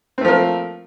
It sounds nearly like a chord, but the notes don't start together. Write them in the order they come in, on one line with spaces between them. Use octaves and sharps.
C4 A3 F3 A#4